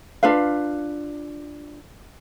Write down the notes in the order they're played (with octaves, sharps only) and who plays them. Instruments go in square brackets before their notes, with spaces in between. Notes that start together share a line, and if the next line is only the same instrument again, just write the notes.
[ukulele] D4 F4 B4 F5